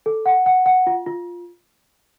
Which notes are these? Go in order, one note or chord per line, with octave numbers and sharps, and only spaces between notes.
A4
F#5
F#5
F#5
F4
F4